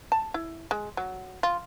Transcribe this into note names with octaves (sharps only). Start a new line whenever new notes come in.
A5
E4
G#3
F#3
F4